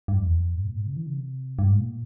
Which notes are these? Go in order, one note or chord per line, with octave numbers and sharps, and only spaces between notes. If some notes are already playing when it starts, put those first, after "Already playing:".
G2
F2
E2
F2
G2
A#2
G#2
C#3
E3
C#3
C3
G2
G#2
A#2